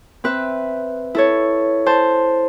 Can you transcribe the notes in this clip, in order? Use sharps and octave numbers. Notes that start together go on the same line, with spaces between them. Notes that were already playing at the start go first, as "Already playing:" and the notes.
C4 B4 E5
E4 A4 C#5
C5 A5